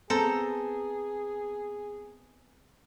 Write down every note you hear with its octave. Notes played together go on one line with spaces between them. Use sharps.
B3 C4 G#4 A4 C5 A#5